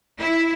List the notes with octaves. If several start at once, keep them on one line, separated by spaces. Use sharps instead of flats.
E4